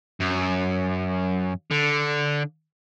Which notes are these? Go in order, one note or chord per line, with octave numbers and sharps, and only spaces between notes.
F#2
D3